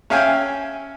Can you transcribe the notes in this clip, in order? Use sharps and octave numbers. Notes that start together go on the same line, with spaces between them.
C#4 E5 F5 G5 G#5